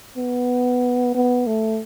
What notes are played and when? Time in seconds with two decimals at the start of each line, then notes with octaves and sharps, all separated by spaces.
0.17 B3
1.15 B3
1.47 A3